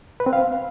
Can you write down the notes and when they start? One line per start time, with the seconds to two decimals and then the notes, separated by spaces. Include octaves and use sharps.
0.20 B4
0.26 C4
0.33 F5